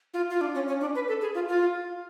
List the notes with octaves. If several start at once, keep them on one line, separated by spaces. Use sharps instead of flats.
F4
F4
D4
C#4
C#4
D4
B4
A4
G#4
F4
F4